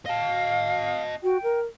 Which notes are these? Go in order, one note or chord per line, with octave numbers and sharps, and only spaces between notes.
D#5 F5 A5
F#4 G5
A#4